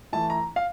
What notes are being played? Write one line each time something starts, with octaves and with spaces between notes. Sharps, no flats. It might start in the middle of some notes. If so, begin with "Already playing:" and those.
E3 A3 E4 A5
A#5
F5